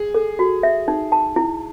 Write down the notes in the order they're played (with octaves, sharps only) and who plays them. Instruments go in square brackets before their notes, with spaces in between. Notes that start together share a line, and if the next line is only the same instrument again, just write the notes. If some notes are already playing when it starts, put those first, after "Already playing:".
Already playing: [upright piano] G#4
[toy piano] A4
F#4
E5
D#4
A5
E4